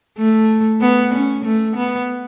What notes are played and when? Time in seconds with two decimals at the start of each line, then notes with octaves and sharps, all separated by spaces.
0.19 A3
0.81 B3
1.14 C#4
1.45 A3
1.76 B3